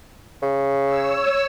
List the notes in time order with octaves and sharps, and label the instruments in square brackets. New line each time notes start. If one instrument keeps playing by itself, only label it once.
[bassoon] C#3
[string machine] C#5 E6